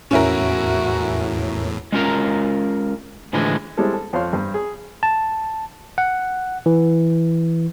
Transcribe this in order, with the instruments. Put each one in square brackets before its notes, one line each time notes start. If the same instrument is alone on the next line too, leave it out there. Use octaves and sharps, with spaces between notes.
[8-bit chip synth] E2 A2 [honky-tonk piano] C#4 E4 A#4 [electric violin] F#4
[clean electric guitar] G#3 C#4 F4 A#4 A#5
A2 D3 E3 F3 G#3
[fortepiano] G3 G#3 C4 E4 A4
A4
F2 C5 C#5 F5 C6
G2 C5
G#4
[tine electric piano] A5
F#5
E3